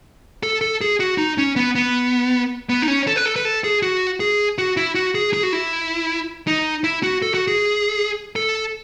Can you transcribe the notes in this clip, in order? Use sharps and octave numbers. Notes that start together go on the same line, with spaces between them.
A4
A4
G#4
F#4
D#4
C#4
B3
B3
B3
D#4
C#4
A4
B4
A4
B4
A4
G#4
F#4
G#4
F#4
E4
F#4
G#4
G#4
F#4
E4
D#4
E4
F#4
A4
F#4
G#4
A4